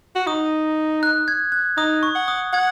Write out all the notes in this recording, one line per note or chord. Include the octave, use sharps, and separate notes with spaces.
F#4
D#4 D#6
F#6
G#6
F#6
D#4 D#6
C#6
F#5
D#6
F#5 G#6